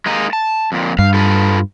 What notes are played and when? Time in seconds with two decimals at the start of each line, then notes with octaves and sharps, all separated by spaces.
0.06 G#3 A#3 D#4
0.33 A5
0.72 F2 A#2
0.99 G2 F5
1.14 F4 A4 B4